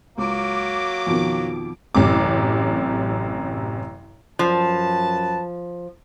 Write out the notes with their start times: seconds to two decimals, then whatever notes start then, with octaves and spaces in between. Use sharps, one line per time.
0.18 C#2 F#3 A#3 D6
1.07 F2 B2 D#3
1.95 A1 F#2 C3 D6
4.39 F#2 F3 B4 A5